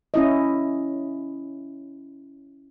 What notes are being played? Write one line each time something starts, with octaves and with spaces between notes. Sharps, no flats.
C#4 E4 D#5